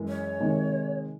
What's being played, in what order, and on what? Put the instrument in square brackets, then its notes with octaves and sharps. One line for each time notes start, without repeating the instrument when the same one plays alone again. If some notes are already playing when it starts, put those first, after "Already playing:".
Already playing: [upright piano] F#2 E3 G#3
[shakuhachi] C#5
[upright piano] C3 D#3 G#3